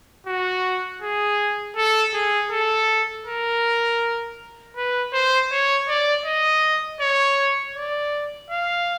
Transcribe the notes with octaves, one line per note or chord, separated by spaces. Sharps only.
F#4
G#4
A4
G#4
A4
A#4
B4
C5
C#5
D5
D#5
C#5
D5
F5